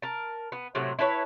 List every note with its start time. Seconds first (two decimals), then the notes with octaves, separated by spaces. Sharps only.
0.02 A#4 A5
0.52 B3
0.75 A2 C3 F#3 A3
0.99 E4 A4 B4 C#5